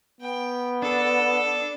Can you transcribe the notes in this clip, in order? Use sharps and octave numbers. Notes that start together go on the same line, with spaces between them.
B3 G5
D4 A4